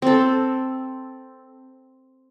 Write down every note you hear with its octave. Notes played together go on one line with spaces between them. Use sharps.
C4 A4